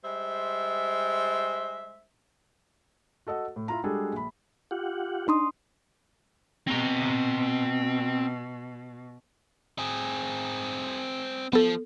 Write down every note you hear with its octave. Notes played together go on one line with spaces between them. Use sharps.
G3 G#3 C5 E5
F#4 A4 D#5 F#5
A2
E4 F4 A#5
G3 G#3 D4 F#4 G#4 A4
A#1 B5
F4 G4 F#5
D4 D#4 C6 D#6
B2 C4 A#5
C4 G#4
F3 B3 A4